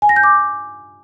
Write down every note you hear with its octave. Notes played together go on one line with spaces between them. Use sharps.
G#5
A#6
G6
D6